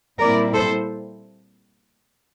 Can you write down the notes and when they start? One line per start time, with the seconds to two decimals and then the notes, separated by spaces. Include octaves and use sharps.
0.19 A#2 G3 C4 E4 A#4 D5
0.53 A4 C5